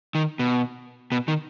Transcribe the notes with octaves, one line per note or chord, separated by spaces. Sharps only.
D#3
B2
B2
D#3